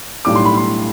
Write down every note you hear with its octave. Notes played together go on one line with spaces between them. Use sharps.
B1 A2 G3 D4 D6
C6
B5
C6